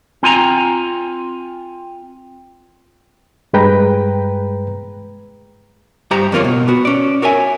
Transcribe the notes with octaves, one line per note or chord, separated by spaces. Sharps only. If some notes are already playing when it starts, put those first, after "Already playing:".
C4 F4 G#5 A#5
G2 G#3 B4 G5 A#5
G2 G4 C5 A#5
F2 D3 A#3 C#4 F4 C#5
B2
B3 F#4
C#4 D5
F#4 A#4 C#5 E5 G#5